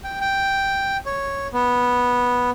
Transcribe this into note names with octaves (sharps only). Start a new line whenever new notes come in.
G5
G5
C#5
B3